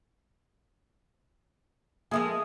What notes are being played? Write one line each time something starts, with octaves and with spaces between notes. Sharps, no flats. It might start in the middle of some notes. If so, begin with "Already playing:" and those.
F3 G#3 A#3 G#4 E5 D#6